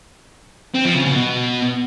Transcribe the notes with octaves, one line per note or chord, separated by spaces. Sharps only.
C4
F3
C#3
B2
B2